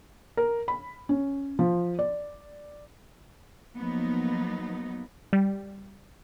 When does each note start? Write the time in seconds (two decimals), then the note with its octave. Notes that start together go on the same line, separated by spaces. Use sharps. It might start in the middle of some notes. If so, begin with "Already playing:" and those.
0.37 A#4
0.68 B5
1.09 C#4
1.59 F3
1.99 D5
3.78 F3 F#3 A#3 B3 D#4
5.33 G3